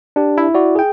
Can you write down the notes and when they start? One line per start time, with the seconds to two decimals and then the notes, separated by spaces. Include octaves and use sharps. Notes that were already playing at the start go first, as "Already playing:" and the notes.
0.16 D4 G4
0.38 E4
0.55 F#4 D5
0.75 G#4 G5